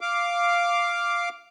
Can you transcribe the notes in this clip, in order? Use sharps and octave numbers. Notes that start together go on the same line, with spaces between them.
F5 D6